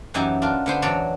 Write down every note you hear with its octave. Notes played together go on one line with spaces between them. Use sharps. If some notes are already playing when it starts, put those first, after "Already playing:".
F#2 E3 F#3 D#4 G4 G#5
D4 F4 F#4 A#4
D3 B3 C5 C6
E2 F#3 D4 C#5 D5